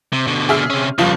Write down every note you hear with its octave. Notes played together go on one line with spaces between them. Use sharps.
C3
B2 D3
G#4 E5 F6
C3 C#4
F1 C#3 F3 G3 F4